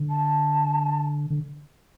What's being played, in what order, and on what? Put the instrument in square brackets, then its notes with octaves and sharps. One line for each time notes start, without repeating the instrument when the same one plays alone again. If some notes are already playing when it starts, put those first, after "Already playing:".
Already playing: [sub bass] D3
[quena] A5
[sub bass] D3